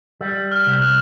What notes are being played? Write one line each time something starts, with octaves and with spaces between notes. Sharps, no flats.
G3 E6
F6
C2
F#6